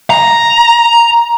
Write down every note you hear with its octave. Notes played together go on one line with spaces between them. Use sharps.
A#5